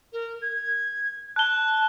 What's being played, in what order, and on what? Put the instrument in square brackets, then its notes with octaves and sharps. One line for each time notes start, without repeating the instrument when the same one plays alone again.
[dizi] A#4
G#6
[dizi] A5 [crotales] F#6 G7